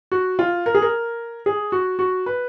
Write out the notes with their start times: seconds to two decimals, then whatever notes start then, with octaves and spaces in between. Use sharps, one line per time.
0.12 F#4
0.39 F4
0.66 A#4
0.75 G#4
0.82 A#4
1.46 G#4
1.72 F#4
1.99 F#4
2.26 B4